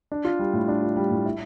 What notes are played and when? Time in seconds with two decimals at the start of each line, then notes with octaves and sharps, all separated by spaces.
0.12 D4
0.25 F4
0.39 G3
0.53 A2
0.68 D4
0.82 F4
0.97 G3
1.10 A2
1.26 E4